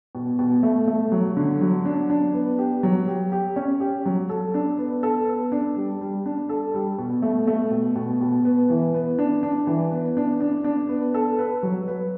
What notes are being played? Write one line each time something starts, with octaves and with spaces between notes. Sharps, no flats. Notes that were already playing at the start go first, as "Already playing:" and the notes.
B2
B2
A3
A3
F#3
D3
F#3
D4
D4
B3
G4
F#3
G4
G4
C#4
G4
F#3
A4
D4
B3
A4
B3
D4
G3
G3
D4
A4
G3
B2
A3
A3
B2
B2
B2
B3
E3
B3
D4
D4
E3
B3
D4
D4
D4
B3
A4
B4
F#3
B4